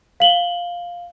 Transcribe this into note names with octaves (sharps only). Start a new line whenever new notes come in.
F5 F#7 G7